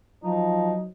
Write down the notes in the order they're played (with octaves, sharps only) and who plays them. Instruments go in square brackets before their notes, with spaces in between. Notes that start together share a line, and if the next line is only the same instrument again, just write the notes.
[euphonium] F3 [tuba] F#3 [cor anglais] D#4